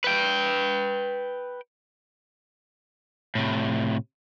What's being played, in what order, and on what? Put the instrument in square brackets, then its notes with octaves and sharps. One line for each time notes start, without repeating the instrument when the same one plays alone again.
[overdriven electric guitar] B4 G5
A2 C3